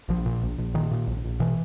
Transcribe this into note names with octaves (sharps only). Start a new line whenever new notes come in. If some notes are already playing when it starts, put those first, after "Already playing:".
A#1 F3
A#2
A#1
A#1
A#2 D#3
A#2
A#1
A#1
B2 E3